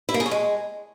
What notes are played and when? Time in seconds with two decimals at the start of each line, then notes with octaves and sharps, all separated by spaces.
0.09 E4
0.14 A#3
0.20 G#4
0.26 C#4
0.31 G#3